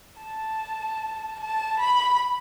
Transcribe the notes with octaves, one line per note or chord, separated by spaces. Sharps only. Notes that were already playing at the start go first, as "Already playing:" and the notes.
A5
A5
B5